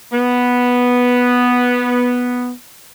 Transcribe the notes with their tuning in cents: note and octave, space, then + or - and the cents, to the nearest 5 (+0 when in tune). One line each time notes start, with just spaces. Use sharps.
B3 -5